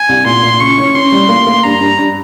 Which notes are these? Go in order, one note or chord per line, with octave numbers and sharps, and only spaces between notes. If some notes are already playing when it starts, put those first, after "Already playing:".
Already playing: G#5
C2
A#2 C6
A#2
C#3 C#6
C#4
C#4 C6
G3
A#3
A#3
G2 A#5
G2
G2